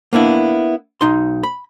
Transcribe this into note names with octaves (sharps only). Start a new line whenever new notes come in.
A#3 B3 D4 E4
B1 D#4 C6
B5